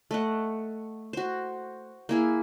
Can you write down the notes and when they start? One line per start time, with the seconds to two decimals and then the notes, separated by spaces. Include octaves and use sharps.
0.11 A3 D#5 F#5
1.13 F#4 C5
2.09 A#3 E4 G#4